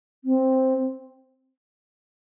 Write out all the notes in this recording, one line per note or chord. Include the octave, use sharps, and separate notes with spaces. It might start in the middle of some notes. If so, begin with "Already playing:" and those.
C4